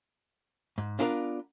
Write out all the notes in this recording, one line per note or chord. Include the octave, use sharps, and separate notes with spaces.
G#2
B3 D4 F4 A#4 D5 F5